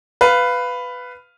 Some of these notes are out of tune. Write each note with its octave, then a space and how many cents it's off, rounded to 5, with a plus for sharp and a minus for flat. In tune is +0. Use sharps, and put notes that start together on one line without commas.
B4 +10 F5 +0